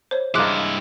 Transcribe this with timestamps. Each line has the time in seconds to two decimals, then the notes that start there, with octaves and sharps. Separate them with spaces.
0.11 C5 C#5
0.34 G2 G#3 A#3 E4 D6 F#6